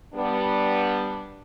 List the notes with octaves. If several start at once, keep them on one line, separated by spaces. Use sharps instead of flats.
G3 B3 D4